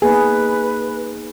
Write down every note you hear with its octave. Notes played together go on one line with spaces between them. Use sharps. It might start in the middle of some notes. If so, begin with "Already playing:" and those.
A#3 B3 D#4 G#4 B4